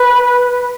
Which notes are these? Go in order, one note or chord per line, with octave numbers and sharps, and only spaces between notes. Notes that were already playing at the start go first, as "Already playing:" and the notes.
Already playing: B4